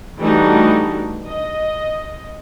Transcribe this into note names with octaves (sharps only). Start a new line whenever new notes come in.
E3 G3 A3 D4 D#4 F#4
D#5